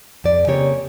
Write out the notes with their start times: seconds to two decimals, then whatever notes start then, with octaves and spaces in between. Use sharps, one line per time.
0.24 F2 D5
0.47 C#3 A#3 C4 C#4 G4 C#5